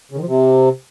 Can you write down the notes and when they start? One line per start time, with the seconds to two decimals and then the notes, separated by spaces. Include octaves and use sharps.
0.12 C#3
0.17 D#3
0.22 F3
0.27 C3